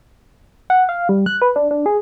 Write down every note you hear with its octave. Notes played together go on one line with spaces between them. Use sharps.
F#5
F5
G3
F#6
B4
D4
D4
G#4